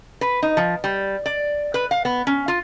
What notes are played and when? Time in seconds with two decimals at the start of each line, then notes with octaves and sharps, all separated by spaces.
0.21 B4
0.42 D#4
0.57 F3
0.84 G3
1.26 D5
1.74 B4
1.91 F5
2.05 B3
2.27 C#4
2.48 F4